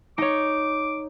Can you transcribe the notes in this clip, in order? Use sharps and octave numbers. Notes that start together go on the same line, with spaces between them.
D#4 C#5 D6